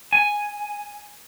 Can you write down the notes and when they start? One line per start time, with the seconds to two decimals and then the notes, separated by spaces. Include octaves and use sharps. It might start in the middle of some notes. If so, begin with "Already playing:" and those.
0.13 G#5